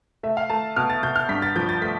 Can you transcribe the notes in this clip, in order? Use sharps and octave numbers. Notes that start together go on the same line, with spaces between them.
A3 E5
F5
A3 A5
B2 F6
A6
B2 G6
F6
G2 B6
A6
F3 G6
A6
A3 B6